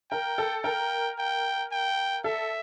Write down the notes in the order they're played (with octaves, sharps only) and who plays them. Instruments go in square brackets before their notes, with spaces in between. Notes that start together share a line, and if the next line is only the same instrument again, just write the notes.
[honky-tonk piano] A#4 [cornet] G5
[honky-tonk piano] A4
[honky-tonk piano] A#4 [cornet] G5
[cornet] G5
G5
[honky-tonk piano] A4 [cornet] E5